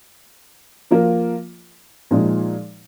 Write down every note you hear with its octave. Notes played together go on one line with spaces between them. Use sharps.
F3 A#3 F4 A#4
A#2 F3 G#3 D#4